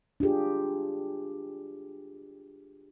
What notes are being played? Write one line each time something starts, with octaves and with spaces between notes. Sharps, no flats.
D4 F4 G4 G#4